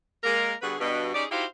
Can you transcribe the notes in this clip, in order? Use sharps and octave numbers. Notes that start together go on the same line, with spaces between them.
G#3 A#3 A#4
D3 G3 B3 F#4 G#4 B4
G2 B2
C#4 D#4 G4 G#4 D5
D#4 E4 F#4 G4 C5 F5